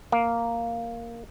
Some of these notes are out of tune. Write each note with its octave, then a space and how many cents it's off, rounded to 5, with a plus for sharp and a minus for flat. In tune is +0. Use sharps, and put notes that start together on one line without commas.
A#3 +0